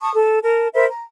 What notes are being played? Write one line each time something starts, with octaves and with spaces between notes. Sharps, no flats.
A5 C#6 D#6
A4
A#4 A5
A#4 C5 E5 B5
A#5